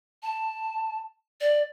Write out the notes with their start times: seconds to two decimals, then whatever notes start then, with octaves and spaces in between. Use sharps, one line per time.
0.23 A5
1.41 D5